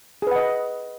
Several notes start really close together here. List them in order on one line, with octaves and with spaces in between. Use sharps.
G#4 B4 F#5 D#5